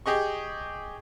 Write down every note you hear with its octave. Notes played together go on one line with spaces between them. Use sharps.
G4 G#4 D#5 C#6